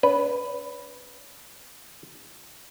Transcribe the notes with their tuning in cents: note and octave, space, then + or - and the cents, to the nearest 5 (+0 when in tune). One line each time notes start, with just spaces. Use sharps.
C#4 +45 B4 +0